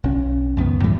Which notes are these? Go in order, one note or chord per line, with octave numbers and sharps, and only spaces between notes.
B1 C#4
C#2 F#2 D#3 B3
A2 E3 G3 A3